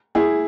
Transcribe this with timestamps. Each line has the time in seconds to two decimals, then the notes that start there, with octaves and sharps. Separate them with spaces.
0.15 E4 G#4